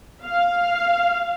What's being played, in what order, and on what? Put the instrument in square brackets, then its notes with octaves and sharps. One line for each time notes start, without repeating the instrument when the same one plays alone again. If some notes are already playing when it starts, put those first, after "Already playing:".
[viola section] F5